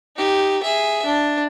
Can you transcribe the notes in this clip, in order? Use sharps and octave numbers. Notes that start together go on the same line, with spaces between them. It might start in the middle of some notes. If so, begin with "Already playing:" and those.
D#4 G4
G#4 E5
D4